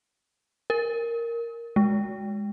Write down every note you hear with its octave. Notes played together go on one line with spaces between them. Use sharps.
A#4
G#3